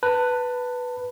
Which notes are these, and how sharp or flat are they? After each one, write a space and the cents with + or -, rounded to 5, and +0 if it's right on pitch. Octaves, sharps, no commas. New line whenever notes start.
B4 +0 A5 +25